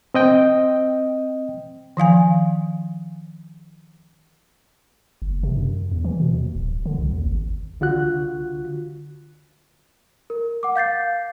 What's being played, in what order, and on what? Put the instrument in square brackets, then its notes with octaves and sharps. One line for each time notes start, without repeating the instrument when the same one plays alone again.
[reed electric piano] C4 D#5 G5
[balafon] D#3 F3 F5 G#5
[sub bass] F#1
C3
F#2
E2
E3
B2
D#2
D1
D3
C2
D#2
G#1
[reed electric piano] C2 D3 F4 F#4 F#6
[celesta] A#4
F#5 D6
F5 G6 A6 C7